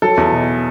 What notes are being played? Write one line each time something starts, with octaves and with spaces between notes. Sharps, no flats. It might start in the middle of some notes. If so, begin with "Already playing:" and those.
F#3 A4
E2
B2